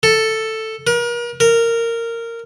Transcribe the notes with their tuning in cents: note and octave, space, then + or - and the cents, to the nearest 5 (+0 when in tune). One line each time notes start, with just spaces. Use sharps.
A4 +5
A#4 +40
A#4 -15